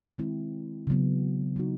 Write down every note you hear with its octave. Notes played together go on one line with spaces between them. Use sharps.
D#3 G#3 C4 E4
C#3 F#3 B3
F#3 B3 D#4 F#4